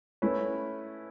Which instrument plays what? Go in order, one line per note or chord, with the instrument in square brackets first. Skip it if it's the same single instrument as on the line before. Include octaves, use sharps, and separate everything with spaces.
[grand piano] A3 C#4 E4 B4